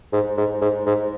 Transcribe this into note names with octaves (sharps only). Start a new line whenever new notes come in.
G#2
G#2
G#2
G#2